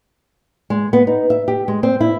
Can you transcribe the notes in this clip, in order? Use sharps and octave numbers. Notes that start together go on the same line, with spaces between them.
G#3
B3
D#4
E5
G4
G#3
C4
E4